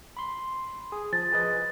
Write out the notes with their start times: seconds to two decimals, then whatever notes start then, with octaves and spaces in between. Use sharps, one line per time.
0.17 B5 C6
0.92 G#4
1.13 F3 A6
1.32 G#4 B4 D#5